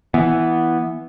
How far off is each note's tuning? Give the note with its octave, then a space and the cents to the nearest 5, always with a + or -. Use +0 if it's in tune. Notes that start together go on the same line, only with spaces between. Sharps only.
E3 +0 B3 +0